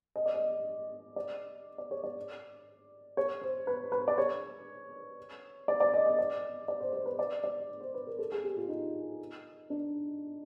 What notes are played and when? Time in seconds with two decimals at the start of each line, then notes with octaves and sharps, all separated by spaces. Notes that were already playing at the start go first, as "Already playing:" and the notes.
0.16 D#5
0.26 D5
0.34 D#5
1.16 D5
1.78 D5
1.91 C#5
2.04 D5
3.17 C#5
3.41 C5
3.67 B4
3.92 B4
4.08 D5
4.18 C#5
5.68 D5
5.80 D5
5.94 D#5
6.06 D#5
6.19 D5
6.68 D5
6.80 C5
6.93 C5
7.06 B4
7.19 D5
7.44 D5
7.81 C5
7.94 B4
8.07 A#4
8.19 A4
8.32 G#4
8.44 G4
8.57 F4
8.68 D#4
9.70 D4